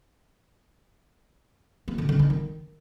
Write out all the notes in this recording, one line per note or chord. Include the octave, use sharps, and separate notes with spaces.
A#3
D3
D3
D#4
D#3